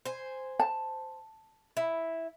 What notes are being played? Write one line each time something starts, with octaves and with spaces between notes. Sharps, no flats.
C5 G#5
A5
E4